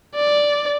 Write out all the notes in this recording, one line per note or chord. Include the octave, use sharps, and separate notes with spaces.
D5